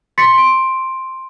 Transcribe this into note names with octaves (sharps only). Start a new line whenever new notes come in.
C6 A6 B6 C#7
C6 D7